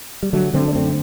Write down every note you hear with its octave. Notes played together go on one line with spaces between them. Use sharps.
G3
D3 F#3 A3
D3 A3 C4
D4
F#2 A3 C4